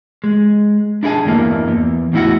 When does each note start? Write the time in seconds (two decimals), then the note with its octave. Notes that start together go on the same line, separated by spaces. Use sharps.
0.24 G#3
1.03 D4 E4 G#4 G#5 A5
1.25 E2 G2 E3 A#3
1.68 E2
2.13 E2 A2 E4 F#4 F#5